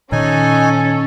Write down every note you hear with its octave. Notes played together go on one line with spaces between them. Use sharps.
A#2 D#3 C#4 D#4 A4 G#5